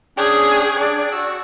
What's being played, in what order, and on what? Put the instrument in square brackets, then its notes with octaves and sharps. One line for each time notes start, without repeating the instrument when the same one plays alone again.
[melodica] C#4 D4 G5 [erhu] G#4
[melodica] D4 [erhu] D5
[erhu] F#4 [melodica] E6